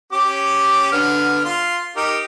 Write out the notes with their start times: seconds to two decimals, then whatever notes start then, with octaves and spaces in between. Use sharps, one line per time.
0.12 C#4 G4 D6
0.92 D3 B3 F6
1.45 F4 C6
1.96 D#4 G4 A#4